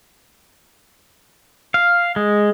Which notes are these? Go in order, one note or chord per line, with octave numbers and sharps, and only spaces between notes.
F5
G#3